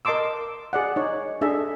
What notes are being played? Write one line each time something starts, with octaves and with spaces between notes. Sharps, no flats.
A#4 D#5 A5 C6 D6 E6
G#4 D5 F#5
D#4 C#5
D4 G#4 A4 E5